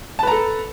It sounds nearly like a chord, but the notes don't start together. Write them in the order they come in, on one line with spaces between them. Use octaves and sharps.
A5 B4 A#5 A4